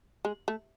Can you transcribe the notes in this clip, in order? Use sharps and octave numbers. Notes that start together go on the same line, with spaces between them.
G#3
A3